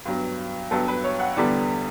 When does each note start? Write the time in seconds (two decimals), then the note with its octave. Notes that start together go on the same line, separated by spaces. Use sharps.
0.05 G2 F#3 B3
0.71 G2 F#3 B3 A4
0.88 B4
1.04 C#5
1.20 F#5
1.36 E2 D3 G3 B3 D5